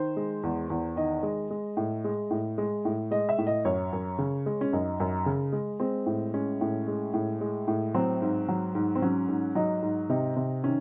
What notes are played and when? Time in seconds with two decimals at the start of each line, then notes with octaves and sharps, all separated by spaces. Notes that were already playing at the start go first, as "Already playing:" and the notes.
Already playing: D#3 C5
0.17 G#3
0.43 E2
0.70 E2
0.96 D#3 D#5
1.23 G#3
1.51 G#3
1.77 A2
2.04 G#3
2.31 A2
2.58 G#3
2.85 A2
3.11 G#3 D#5
3.29 E5
3.38 A2
3.47 D#5
3.65 F#2 C#5
3.93 F#2
4.18 C#3
4.46 G#3
4.61 C#4
4.73 F#2 D#4
5.00 F#2
5.26 C#3
5.53 G#3
5.80 G#3 C4
6.06 A2
6.34 G#3 C#4
6.61 A2
6.88 G#3
7.14 A2
7.41 G#3
7.68 A2
7.94 F#3 C4
8.22 G#2
8.48 F#3
8.75 G#2
8.95 C4
9.02 F#3 C#4
9.28 G#2
9.55 F#3 D#4
9.82 G#2
10.09 C3 D#4
10.36 C3
10.64 D#3 C#4